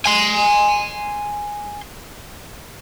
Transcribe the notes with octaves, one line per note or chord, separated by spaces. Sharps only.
G#5 C6